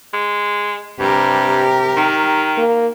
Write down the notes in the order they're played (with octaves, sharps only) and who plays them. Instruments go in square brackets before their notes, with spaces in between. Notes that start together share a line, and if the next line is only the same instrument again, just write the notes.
[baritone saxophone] G#3
[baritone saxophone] G2 [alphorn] C3 [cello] G4 A#4
[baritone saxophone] D#3
[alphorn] A#3